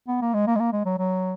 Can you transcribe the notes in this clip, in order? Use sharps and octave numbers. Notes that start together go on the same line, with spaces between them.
B3
A#3
G#3
A#3
G#3
A#3
G#3
F#3
F#3